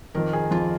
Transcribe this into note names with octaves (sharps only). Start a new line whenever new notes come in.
F2 D#3 A#4
G#4
F2 D#3 F4